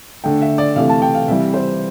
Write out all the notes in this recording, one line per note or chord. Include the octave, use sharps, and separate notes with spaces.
D3 A3 G5
E5
D5
C3 E3 A3 F5
A5
G5
F5
C3 E3 G3 E5
C5